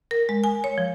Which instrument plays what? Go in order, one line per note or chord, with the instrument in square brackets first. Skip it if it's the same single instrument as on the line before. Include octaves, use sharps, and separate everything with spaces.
[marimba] A#4
G#3
G#5
C#5
F3